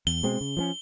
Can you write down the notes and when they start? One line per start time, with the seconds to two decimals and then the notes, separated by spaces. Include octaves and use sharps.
0.07 E2 G7
0.23 B2 G#3 C4
0.41 C#3
0.57 F3 A#3 C#4